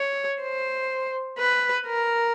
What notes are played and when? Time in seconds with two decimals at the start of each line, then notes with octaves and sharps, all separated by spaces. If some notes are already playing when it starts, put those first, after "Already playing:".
Already playing: C#5
0.41 C5
1.39 B4
1.87 A#4